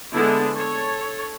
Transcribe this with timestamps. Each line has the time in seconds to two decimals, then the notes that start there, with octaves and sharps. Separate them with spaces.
0.14 D3 G#3 B3 D4 E4
0.57 A4 C#5